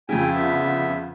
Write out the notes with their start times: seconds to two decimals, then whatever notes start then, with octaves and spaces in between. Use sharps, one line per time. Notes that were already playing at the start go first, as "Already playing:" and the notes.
0.09 F2 C#3 G5 G#5
0.32 D3 B3 E5